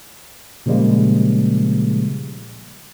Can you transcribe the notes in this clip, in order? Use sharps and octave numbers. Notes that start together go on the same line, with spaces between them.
A#2 C#3 F3 G3 G#3 A#3